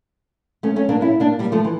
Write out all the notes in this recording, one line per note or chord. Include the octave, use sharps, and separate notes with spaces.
A3 C#4
A3 C#4
A#3 D4
C#4 E4
A#3 D4
G3 A#3
F3 A3
E3